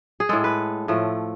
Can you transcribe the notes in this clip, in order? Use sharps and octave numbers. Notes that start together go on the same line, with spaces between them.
G#4
A2 G#3 A4
B4
A2 F3 A3